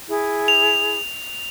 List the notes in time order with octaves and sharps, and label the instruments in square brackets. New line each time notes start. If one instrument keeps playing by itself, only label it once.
[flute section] E4 G#4
[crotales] F7